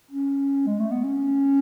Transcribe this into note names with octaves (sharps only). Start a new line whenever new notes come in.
C#4
G#3
A3
B3
C#4